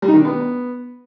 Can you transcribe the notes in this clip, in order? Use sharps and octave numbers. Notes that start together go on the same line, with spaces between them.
G3
D#4
D#3
D4
B3